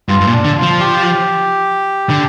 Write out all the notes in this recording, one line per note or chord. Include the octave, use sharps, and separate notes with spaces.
G2 F4
G2
A#2
D4
D3
F4
F3
G4
D3